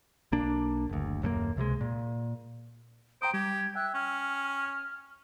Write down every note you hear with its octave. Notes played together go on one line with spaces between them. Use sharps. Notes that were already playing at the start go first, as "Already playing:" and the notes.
B1 A#3 D4
F#1 D2
D#1 F#2 A3 A#3
C#2 C3 G3 G#3
A#2
C5 G5 A#5 D#6 D7
G3 G4 G#6
E5 G5 F#6
C#4 F6